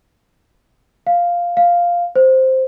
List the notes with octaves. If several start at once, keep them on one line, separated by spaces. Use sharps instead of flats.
F5
F5
C5